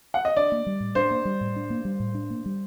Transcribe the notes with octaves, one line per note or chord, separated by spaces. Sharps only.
F#5
D#5
D4 D5
A#3
G3
A2
D4 C5
A#3
G3
A2
D4
A#3
G3
A2
D4
A#3
G3